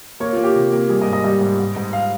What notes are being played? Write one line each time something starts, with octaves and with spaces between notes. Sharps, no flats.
A#3 C#5
A#3 F4
G4
C3
A#3
G3 G#4
D#5
G#2
D#5
G3 D#5
G#2
G#2
G#2
F5